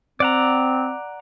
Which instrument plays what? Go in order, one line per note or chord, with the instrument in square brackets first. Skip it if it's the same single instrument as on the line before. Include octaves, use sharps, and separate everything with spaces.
[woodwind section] C4 [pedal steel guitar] D5 F#5 A#5